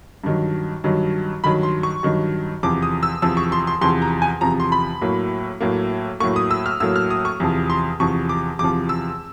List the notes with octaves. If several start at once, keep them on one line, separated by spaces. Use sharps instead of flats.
G2 D#3 F#3
G2 D#3 F#3
G2 D#3 F#3 B5
C6
C#6
G2 D#3 F#3
E2 C3 F3 D6
D#6
E6
E2 C3 F3 E6
C#6
C6
C6
E2 C3 F3 C6
A#5
G#5
E2 C3 F3 A#5
C6
B5
A2 F#3 A#3
A2 F#3 A#3
A2 F#3 A#3 C#6
D#6
E6
F6
A2 F#3 A#3 E6
F6
D#6
C#6
E2 C3 F3
C6
E2 C3 F3 C#6
D6
E2 C3 F3 D6
E6